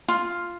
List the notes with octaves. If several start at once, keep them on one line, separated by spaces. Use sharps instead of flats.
F4